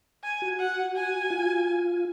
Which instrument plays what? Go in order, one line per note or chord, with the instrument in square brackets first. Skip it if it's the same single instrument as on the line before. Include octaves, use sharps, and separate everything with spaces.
[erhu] G#5
[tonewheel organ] F#4
[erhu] F#5
G#5
[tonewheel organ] F4